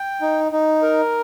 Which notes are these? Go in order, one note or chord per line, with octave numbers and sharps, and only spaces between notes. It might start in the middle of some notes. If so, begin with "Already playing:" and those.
Already playing: G5
D#4
D#4
A#4